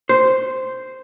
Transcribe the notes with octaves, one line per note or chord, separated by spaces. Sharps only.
C5